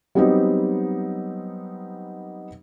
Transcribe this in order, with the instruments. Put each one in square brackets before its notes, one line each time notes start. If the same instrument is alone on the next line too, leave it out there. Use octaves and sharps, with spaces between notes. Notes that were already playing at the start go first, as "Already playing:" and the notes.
[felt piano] F#3 G3 B3 C4 D#4 G4